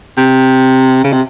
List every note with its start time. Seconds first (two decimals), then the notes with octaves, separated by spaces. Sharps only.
0.18 C3
1.04 C#3
1.13 C3